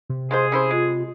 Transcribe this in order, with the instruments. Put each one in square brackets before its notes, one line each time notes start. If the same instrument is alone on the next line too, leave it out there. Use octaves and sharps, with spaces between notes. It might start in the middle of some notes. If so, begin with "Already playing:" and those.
[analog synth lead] C3
[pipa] G#3 F4 C5 [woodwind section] G#4
[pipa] C#4 E4 C5
[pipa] G#3 [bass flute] F4